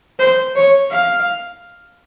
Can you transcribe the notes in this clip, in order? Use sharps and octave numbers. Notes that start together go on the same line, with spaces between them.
C5
C#5
F5